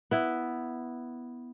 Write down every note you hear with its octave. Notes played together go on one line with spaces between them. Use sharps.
B3 E4